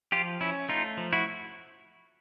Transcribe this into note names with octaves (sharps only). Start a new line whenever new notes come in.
F3 F4 G4
C#4 E4
A3 D#4 F4
F3
E4 F#4